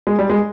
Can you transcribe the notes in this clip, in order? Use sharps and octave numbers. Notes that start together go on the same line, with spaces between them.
G#3
G3
G#3